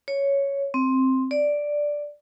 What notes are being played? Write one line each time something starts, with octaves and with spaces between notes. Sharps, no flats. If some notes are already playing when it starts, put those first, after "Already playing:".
C#5
C4
D5